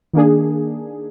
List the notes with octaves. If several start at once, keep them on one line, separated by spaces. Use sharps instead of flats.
D#3 A#3 D4 G#4